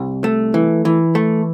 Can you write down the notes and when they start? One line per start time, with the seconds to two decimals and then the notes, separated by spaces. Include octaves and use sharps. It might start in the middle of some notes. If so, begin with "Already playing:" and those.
Already playing: C2
0.24 A3
0.54 E3
0.85 E3
1.15 A3